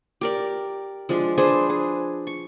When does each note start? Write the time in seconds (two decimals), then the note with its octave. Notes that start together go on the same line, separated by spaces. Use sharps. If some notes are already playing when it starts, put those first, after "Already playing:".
0.21 G4 A#4 D5
1.09 F3 G#3 D4
1.38 D4 G#4 B4 C5
1.70 G#4
2.27 C#6